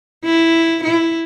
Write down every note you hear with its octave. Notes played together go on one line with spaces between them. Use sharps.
E4
E4